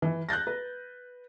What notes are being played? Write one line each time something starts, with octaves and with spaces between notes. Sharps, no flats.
E3
F#6 G6 A6 A#6
B4